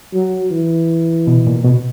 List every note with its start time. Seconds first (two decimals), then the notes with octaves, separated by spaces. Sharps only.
0.14 F#3
0.51 E3
1.27 B2
1.47 A#2
1.65 B2